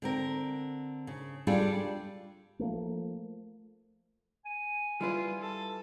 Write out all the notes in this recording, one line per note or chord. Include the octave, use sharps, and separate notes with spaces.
D3 C4 A#4
C#3
G3 D4 F4 G#4 A4
F3 A3 A#3
G#5
G3 E4 F4 B4
A4